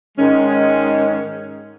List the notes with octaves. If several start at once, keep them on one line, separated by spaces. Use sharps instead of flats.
G#2 D#3 G#3 C#4